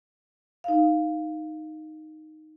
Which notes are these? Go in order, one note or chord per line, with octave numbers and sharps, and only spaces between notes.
D#4 F5